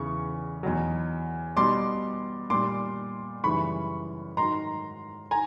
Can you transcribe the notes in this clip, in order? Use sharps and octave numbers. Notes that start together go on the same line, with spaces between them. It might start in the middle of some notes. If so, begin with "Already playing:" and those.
Already playing: E2 C#3 E3 C#6
E2 B2 F#3
B2 G3 C6 D6
A#2 G3 C6 D6
F#2 C#3 E3 G3 B5 C#6
G#2 D#3 F#3 A#5 C6
G#5 A#5